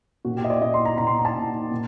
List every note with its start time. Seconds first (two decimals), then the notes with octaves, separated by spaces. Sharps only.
0.25 A#2 F#4
0.37 G4
0.44 D#5
0.50 D5
0.61 A#2 D#5
0.74 C6
0.85 A#5
0.98 A#2 A#5
1.07 C6
1.19 A#5
1.25 A5
1.35 A#2
1.71 A#2